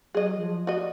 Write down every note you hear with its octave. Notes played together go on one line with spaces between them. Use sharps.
F#3 G#4 D#5
F3
F#4 D5 D#5